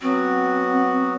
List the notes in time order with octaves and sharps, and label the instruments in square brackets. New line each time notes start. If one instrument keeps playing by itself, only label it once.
[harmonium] F#3 B3 F#4 [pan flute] C4